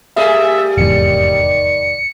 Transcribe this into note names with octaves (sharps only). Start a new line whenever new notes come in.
G3 A3 G#4 E5
F1 E2 G#2 D#3 D5 C#7